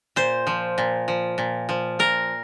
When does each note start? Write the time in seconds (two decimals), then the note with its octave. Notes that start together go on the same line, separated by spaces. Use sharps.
0.16 A#2 C5
0.47 F3
0.78 A#2
1.08 F3
1.38 A#2
1.69 F3
1.99 A#2 A#4